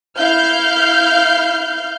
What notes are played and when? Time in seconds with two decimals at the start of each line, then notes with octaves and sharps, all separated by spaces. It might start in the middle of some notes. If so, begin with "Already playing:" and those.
0.16 E4 F5 F6 G6